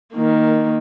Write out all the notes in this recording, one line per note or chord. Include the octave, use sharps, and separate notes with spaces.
D#3 A#3